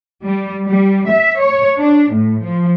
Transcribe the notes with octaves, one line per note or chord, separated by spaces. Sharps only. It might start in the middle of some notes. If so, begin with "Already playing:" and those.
G3
G3
E5
C#5
D4
A2
F3